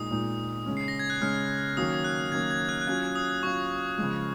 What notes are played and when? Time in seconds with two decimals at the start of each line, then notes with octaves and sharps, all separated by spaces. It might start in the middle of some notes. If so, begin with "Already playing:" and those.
Already playing: A#2 G#3 D#4 D#6
0.11 A#2 G#3 D#4
0.66 C#3 G#3 C#4
0.77 C7
0.88 A#6
0.99 G#6
1.10 F#6
1.21 C#3 G#3 C#4 F6
1.77 D#3 F#3 A#3 C#4 D#6
2.04 F#6
2.32 D#3 F#3 A#3 C#4 G#6
2.51 G#6
2.69 F#6
2.81 F#6
2.87 F#3 C#4 F4 G#6
3.16 D#6
3.43 F#3 C#4 F4 C#6
3.98 C#3 F3 G#3